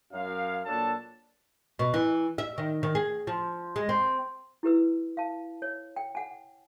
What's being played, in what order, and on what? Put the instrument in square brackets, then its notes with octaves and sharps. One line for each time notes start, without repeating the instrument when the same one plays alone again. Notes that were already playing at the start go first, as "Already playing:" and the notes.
[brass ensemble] F#2 F5
A#2 F#3 D4 A4 A5
[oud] B2
E3
E5
D#3
D#3
G#4
F3
G#3
C4
[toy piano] E4 G4 B4 E6
F5 A5
C#5
G5
F#5 G#5